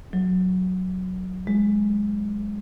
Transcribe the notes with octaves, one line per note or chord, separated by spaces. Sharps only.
F#3
G#3